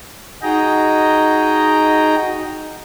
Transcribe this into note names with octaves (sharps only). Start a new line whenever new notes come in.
D#4 F#4 G#4 D#5 G5 A#5